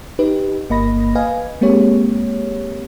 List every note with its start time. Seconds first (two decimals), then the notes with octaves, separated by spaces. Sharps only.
0.19 D#4 G4 B4
0.70 G1 A#3 D#5 B5 A#6
1.15 B4 D#5 F5 G#5
1.61 G#3 A#3 C4 G4 C#5